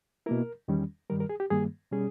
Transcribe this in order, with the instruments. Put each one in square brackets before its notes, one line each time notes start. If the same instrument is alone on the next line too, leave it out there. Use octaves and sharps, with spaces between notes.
[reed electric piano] B2 A#3 E4 A#4
E2 D#3 G3 C#4
G2 D#3 G3 A#4
A#4
G#4
G4
G2 D#3 G3 A#3 G#4
B2 G3 C#4 G#4